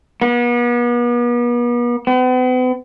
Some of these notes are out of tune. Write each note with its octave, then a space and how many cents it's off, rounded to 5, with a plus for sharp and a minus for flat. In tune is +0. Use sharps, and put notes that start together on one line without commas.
B3 -40
B3 +45